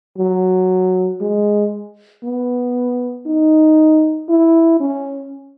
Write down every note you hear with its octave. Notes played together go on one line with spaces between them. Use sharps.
F#3
G#3
B3
D#4
E4
C#4